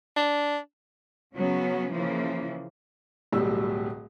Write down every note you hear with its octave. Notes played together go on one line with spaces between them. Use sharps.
D4
C#3 F#3 B3 C#4
C#3 E3 F3 A#3
D1 B1 A2 F#3 G3 E6